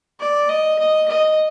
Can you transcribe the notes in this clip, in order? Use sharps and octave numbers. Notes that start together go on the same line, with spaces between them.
D5
D#5
D#5
D#5